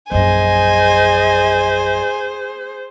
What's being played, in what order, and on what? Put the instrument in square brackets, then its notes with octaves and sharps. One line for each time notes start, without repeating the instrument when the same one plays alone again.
[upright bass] A#1 F#2 [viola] G#4 C5 [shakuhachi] D#5 [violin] G#5